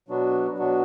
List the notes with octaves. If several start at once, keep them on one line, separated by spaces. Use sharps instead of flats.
B2 F#3 B3 D4 F#4
B2 F#3 B3 D4 F#4